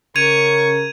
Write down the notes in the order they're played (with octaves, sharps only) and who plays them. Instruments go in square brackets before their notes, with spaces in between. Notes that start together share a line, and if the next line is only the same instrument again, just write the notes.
[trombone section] C#3 A#4 [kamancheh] C#6 [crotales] G#6 D#7 F7